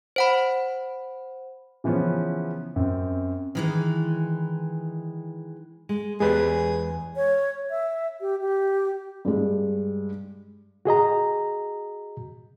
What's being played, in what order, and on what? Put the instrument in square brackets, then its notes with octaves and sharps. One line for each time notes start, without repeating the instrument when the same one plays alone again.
[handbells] C5 F#5 B5
[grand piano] C#3 E3 F3 B3 C#4
F#2 C4
[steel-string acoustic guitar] D#3 E3 G#3
[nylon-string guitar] G#3
[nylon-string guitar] E2 G4 C5 [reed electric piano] G#3 B4 G#5 [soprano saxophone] G#4
[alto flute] C#5
E5
G4
G4
[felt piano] G2 G#3
[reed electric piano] F#4 G#4 D#5 A#5